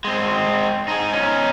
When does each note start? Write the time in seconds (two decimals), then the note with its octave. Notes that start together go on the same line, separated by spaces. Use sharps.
0.05 G#3 C4
0.88 D#4 G#4
1.13 C#4 D#4